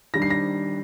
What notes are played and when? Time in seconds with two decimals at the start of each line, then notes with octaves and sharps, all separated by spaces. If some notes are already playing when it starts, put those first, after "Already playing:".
0.14 D#3 G3 D4 A#6
0.22 C7
0.30 A#6